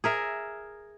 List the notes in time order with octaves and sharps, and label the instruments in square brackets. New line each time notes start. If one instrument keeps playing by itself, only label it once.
[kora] G#4 A#4 E5